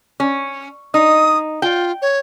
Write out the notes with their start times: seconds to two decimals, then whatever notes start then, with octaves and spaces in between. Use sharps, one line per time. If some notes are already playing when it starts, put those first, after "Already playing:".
0.20 C#4
0.94 D#4 D#6
1.62 F4 G5
2.02 C#5